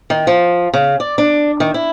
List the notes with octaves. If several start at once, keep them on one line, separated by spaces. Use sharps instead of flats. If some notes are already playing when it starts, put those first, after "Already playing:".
D#3
F3
C#3
D5
D4
D#3
E4